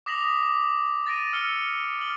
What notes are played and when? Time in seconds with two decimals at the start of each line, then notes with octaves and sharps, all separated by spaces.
0.06 D6 D#6 A#6 B6 F7 F#7
0.43 D6
1.06 A6 A#6 D7 D#7
1.33 E6 F6 C#7 G7
1.99 F6 F#7